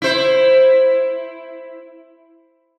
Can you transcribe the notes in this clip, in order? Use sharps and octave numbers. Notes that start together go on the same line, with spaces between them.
E4 C5